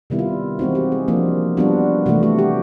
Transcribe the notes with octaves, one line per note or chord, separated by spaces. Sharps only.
C3 D#3 G3 B3 E4
F4
E3 G#3 C4 D#4 F#4
G4
G#4
F3 A#3 D4 F4
G3 B3 D4 F4 F#4
C3 E3 A3 F#4
F#4
G4